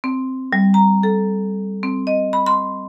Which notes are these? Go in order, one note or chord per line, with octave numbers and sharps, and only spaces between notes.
C4
G3
A#5
A4
C4
D#5
B5
C6